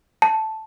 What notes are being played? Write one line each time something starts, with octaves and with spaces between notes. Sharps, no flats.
A5